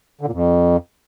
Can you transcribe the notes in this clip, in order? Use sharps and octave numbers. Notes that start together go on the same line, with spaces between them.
D3
A#2
F2